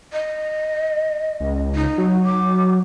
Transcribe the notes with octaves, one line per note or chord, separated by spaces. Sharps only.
D#5
C#2
D#4
F#3
D6